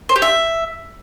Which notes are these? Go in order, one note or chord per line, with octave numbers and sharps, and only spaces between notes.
C5
G4
E5